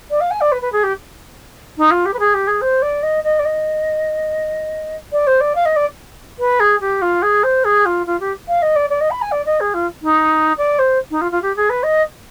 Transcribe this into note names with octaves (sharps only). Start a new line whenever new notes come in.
D5
F5
G#5
D5
B4
B4
G#4
G4
D#4
F4
G4
B4
G#4
G4
G#4
C5
D5
D#5
D#5
D5
D#5
D5
C5
D5
F5
D#5
D5
B4
G#4
G4
F4
G#4
C5
G#4
F4
F4
G4
F5
D#5
D5
D5
D#5
B5
G#5
D5
D#5
G#4
F4
D#4
D5
C5
D#4
F4
F4
G4
G#4
B4
D#5